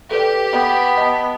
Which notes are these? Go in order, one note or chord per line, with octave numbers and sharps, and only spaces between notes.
G4 A4 B4 D5
B3
D#5 A5